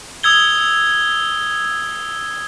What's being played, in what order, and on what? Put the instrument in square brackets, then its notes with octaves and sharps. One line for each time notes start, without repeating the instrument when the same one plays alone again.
[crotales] D#6 E6 G#6 G7